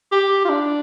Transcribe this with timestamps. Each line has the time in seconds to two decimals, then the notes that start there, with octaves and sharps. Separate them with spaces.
0.12 G4
0.45 F4
0.49 D4